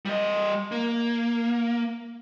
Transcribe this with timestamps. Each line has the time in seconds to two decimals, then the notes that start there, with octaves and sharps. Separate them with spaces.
0.05 G3 D#5
0.72 A#3